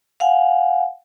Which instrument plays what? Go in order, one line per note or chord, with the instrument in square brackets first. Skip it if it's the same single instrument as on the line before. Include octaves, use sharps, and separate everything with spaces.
[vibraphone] F5 F#5 G#5